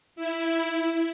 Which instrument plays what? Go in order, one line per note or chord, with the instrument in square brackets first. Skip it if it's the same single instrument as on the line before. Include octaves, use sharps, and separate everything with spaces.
[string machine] E4